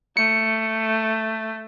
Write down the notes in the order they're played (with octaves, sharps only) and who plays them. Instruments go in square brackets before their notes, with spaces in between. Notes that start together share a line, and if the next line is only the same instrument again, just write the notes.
[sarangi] A3 [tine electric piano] C#7